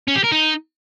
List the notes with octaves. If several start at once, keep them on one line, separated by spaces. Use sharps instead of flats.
C#4
G4
A#4
D#4